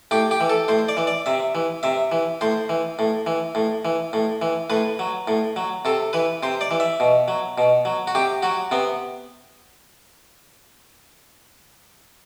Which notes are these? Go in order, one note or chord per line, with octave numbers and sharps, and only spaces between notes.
A2 G4
G4
E3
A4
A2 C5
D5
E3
D5
C3 E5
E3
C3 E5
E3
A2 C5
E3
A2
E3
A2
E3
A2
E3
A2 B4
F#3
A2
F#3
C3 A4
E3 B4
C3 C5
D5
E3
E5
B2
F#3
B2
F#3
F#4
C3 G4
F#3 F#4
C3 B3